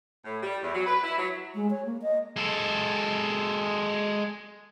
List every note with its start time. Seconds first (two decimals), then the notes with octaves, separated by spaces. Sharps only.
0.25 A2
0.43 G3
0.62 E2
0.74 F#3
0.86 B4
1.04 E4
1.19 F#3
1.55 G#3
1.70 C#5
1.85 A#3
2.02 D#5
2.36 G#3 A4